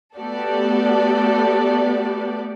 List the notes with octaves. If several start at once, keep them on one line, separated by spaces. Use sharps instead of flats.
A3 B3 F#4 G4 A4 D5